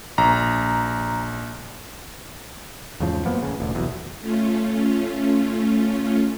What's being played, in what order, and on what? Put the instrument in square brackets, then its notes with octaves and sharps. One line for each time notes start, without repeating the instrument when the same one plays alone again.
[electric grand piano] A#1 A#5
[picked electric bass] E2 G#2 C#3 F3
F#2 F3 A#3 B3
A1 C#3
E1 A1 D2
F1 B1 E2 B2
[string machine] A3 C#4 F4